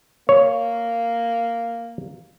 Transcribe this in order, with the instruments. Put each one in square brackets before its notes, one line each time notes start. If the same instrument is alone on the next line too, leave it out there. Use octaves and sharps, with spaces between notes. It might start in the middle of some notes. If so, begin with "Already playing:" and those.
[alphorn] A#3 [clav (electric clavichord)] C#5